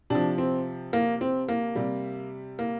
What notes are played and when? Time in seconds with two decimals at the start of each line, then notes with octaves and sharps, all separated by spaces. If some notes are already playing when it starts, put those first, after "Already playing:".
0.10 C3 F3 D4
0.38 C4
0.93 A#3
1.21 C4
1.48 A#3
1.75 C3 G3
2.59 A#3